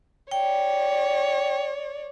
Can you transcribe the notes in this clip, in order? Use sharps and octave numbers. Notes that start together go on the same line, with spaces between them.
C#5 D5 G5